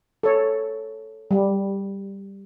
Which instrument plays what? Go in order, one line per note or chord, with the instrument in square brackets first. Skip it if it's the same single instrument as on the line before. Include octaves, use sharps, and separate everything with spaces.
[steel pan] A4 C#5
G3